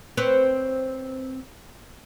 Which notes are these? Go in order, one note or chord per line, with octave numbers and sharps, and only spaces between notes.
C4 B4 C#5